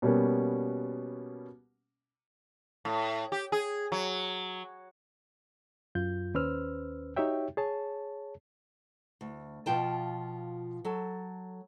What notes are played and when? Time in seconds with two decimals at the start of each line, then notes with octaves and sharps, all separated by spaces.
0.02 B2 G3 A#3 B3 C#4
2.85 A2
3.32 G4
3.52 G#4
3.92 F#3
5.95 F#2 F4 G6
6.34 D#2 C#4 B4 C5 E6 F6
7.16 D#4 F#4 G4 C#5 E5 G5
7.57 G#4 C#5 A5
9.21 D2
9.66 B2 F3 F4 G5 A5
10.85 F#3 A4